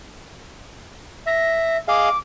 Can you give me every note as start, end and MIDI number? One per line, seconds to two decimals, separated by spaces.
1.26 1.77 76
1.26 1.76 94
1.88 2.09 68
1.88 2.09 75
1.88 2.09 77
1.88 2.17 86